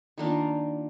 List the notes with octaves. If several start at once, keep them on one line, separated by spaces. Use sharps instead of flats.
D#3 A#3 D4 F4